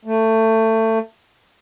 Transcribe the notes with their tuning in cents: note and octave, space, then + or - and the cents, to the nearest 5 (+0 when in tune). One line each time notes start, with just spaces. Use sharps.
A3 +20